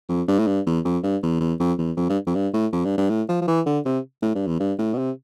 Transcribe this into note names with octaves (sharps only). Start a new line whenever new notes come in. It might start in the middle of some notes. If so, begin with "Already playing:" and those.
F2
G2
A2
G2
E2
F2
G2
E2
E2
F2
E2
F2
G2
F2
G2
A2
F2
G2
G2
A2
F3
F3
E3
D3
C3
A2
G2
E2
G2
A2
B2
C3